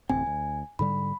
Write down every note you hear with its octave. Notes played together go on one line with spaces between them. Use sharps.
D1 A1 C4 G#5
D2
G#2 D3 G3 B5